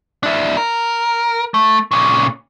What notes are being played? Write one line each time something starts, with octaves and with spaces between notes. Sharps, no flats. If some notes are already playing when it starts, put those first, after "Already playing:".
D4 E4
A#4
A3
A#2 C#3